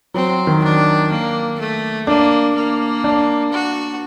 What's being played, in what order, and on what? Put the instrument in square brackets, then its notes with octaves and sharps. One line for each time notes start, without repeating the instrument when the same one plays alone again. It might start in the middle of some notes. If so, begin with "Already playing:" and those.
[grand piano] F#3 [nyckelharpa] C4
[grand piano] D#3
[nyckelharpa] D4
A#3
A3
[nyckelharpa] A#3 [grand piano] D4
[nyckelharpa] A#3
[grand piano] D4
[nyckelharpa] F#4